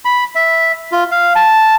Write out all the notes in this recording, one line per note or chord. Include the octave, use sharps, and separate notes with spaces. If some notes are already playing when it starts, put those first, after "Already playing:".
B5
E5
F4
F5
A5